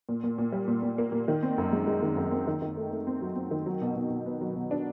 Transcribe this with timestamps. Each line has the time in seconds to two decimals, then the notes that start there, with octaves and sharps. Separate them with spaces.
0.09 A#2
0.24 A#2
0.38 A#2
0.52 G3
0.68 A#2
0.83 A#2
0.98 A#3
1.12 A#2
1.28 D#3
1.43 C4
1.58 F#2
1.73 G#3
1.87 G#3
2.02 D#3
2.17 F#2
2.31 C4
2.47 D#3
2.62 D#3
2.77 A3
2.91 A3
3.07 C4
3.21 F#3
3.36 C4
3.51 D#3
3.66 F#3
3.81 B2
3.96 B2
4.10 B2
4.26 B3
4.41 F#3
4.55 B2
4.71 D4